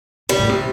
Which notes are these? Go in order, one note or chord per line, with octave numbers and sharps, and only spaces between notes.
C3 G3
A2
C3